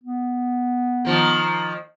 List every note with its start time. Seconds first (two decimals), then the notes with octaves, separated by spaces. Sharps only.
0.04 B3
1.05 D#3 F3 A#3